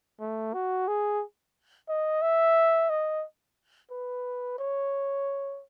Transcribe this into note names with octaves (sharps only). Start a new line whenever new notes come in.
A3
F#4
G#4
D#5
E5
D#5
B4
C#5